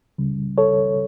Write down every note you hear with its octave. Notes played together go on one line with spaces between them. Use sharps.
C#2 C#3 G3
A4 C#5